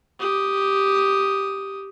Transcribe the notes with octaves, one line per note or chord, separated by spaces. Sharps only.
G4 D#6